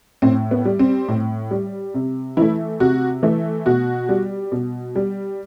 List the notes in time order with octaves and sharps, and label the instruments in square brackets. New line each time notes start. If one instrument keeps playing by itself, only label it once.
[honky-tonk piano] A2 C4
B3
G3
C4
A2
G3
C3
E3 A3 E4
C3 F#4
E3 A3
B2 F#4
G3
B2
G3